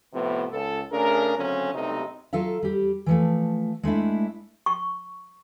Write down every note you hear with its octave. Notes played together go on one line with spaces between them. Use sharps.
A2 C3 F3 B3
C#2 A4
C#3 A3 D4 G#4 A#4
D2 C#3 F#3 A3 C4 C#4
B1 G2 C3 A3 C4 D#4
F#3 F4 A4 E5 F5
G3 G4
E3 F3 A3
G#3 A3 D4 E4
C#6